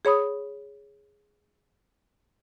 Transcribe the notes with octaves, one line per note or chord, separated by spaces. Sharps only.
G#4 C#5 B5 D#6